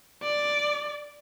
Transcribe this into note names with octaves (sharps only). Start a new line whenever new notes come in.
D5